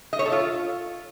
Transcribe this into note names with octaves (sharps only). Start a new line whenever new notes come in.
D#5
C#5
A4
F4